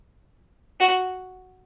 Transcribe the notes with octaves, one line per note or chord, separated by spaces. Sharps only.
F#4